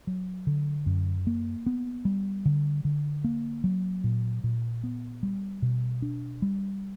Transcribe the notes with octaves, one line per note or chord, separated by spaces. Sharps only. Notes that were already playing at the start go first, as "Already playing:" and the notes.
F#3
D3
F#2
A#3
B3
G3
D3
D3
A#3
F#3
A#2
A#2
B3
G3
B2
D4
G3